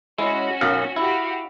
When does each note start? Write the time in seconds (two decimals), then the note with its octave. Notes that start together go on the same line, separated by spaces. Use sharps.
0.18 G#3 C#4 E4 F#4
0.61 B1 F#2 F5
0.96 E4 F#4 G4 F5